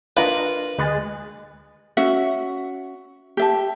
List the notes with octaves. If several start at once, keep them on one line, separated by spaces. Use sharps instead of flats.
D4 F4 A#4 B4 D#5
D2 G#3 F#6 A6
C#4 F#4 E5 F#5
G4 E5 A5